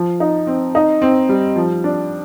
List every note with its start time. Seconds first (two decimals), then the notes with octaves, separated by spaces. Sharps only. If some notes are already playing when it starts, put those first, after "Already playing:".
Already playing: F3
0.20 D#4
0.47 C4
0.75 D#4
1.02 C4
1.29 G3
1.56 F3
1.84 D4